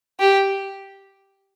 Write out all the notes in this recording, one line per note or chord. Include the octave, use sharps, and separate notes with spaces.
G4